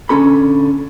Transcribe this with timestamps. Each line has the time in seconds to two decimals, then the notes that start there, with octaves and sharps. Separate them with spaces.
0.09 A#2 D3 C#4 A4 B5